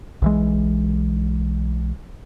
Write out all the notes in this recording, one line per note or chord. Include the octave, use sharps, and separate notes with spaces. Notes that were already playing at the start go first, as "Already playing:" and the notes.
B1 E3 G#3